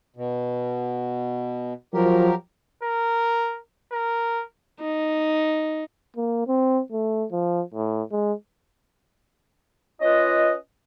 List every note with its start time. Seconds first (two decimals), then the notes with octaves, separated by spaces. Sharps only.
0.16 B2
1.94 F3 F#3 G4 A#4
2.83 A#4
3.92 A#4
4.80 D#4
6.16 A#3
6.47 C4
6.92 A3
7.32 F3
7.74 A2
8.12 G#3
10.01 C#4 F4 B4 D#5